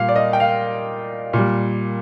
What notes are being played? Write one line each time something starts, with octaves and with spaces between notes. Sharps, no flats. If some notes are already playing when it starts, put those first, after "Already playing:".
Already playing: A#2 G3 F5
D5
D#5
G5
F5
A#2 G3